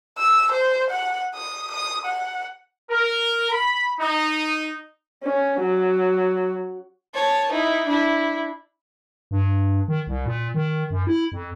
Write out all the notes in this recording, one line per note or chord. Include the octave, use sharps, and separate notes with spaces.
E6
C5
F#5
D#6
D#6
F#5
A#4
B5
D#4
C#4
F#3
C#5 A5
D#4 E4
D4 E4
G2
D#3
C2
A#2
D#3
F#2
E4
F2